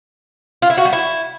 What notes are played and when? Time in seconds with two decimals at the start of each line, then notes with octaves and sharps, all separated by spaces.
0.62 F4
0.70 E4
0.78 F#4
0.85 G3
0.93 E4